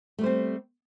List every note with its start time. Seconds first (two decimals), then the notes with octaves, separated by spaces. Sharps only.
0.18 A3
0.21 G3
0.24 C5
0.26 C4